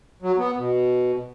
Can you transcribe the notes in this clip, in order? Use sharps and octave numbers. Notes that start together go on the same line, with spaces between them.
F#3
B3
B2